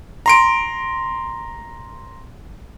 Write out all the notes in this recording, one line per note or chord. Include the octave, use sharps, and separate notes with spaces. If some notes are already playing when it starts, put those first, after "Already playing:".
A#5 C6 D7